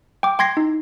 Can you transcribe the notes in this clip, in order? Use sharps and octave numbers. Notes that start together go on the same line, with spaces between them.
G5 D6
G5 C6 G#6 A#6 C7
D#4